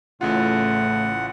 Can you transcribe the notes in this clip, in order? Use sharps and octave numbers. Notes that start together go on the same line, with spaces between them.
A1 A2 C#3 F4 F#5